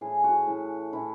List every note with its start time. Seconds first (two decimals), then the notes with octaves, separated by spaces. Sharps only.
0.01 A2 E3 A3 G#4
0.24 F#4
0.47 A2 E3 A3
0.92 A2 E3 A3 E4